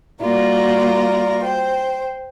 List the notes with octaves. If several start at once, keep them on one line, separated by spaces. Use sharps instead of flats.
G3 A#3 F4 F#4 A#4 D5
C5 G5